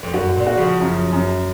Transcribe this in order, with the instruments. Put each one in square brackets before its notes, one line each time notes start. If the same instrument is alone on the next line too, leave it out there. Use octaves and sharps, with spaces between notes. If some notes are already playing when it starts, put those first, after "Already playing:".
[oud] F2
[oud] F#2 [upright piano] F#4
[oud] A#2
[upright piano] F#4
[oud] C#3 F3
[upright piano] F#2
F#2